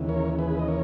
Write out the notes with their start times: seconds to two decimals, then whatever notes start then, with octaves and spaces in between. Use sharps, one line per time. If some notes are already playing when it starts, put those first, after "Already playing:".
Already playing: D#2 C#3 E3
0.09 A#4 C#5
0.39 G#4 B4
0.59 D#5
0.68 A#4 C#5